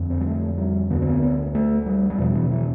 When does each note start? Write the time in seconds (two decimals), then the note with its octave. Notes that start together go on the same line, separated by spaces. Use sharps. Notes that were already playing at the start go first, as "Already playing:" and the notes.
Already playing: F2 D3
0.10 C4
0.20 G3
0.26 A3
0.58 G3
0.91 D2 D3 B3
1.02 C4
1.07 B3
1.22 B3
1.55 A3
1.86 G3
2.10 G3
2.18 E2 B2 F3
2.35 E3
2.52 E3